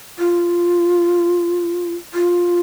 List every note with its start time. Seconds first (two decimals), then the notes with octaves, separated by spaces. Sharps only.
0.19 F4
2.14 F4